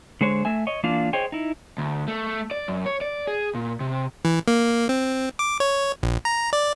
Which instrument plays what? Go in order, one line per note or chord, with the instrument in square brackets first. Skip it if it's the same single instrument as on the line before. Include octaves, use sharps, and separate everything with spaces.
[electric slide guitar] D3 G#3 C5 C#5
A3 E5 G#5
C#5 D#5
E3 A#3 D4 F4 F5
G#4 C5 C#5 D#5 G5
D#4 E4
[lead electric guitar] D2
A3
D5
F#2
C#5
D5
G#4
A#2
C3
[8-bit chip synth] E3
A#3
C4
D6
C#5
A#1
A#5
D5